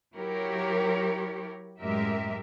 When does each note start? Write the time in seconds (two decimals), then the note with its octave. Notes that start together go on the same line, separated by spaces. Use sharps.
0.15 F#3 E4 G4 A#4 C#5
1.80 F#2 A2 G#3 G4 A#4 E5